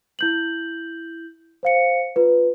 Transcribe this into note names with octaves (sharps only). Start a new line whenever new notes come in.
E4 G6 F#7
C5 F5 C#7
F4 B4